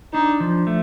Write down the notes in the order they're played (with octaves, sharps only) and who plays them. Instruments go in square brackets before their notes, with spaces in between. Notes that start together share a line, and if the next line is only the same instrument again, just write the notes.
[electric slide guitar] D4 [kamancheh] D#4
[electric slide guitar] F3
A3